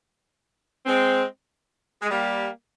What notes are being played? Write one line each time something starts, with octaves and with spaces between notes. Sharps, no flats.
G#3 C4
G#3
G3 A#3